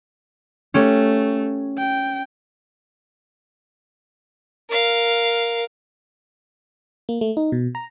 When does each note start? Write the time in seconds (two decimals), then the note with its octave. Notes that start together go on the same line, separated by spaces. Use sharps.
0.74 A3 C#4 G4 C#5
1.78 G5
4.70 A#4 F5
7.09 A#3
7.21 A3
7.37 D#4
7.52 B2
7.75 A#5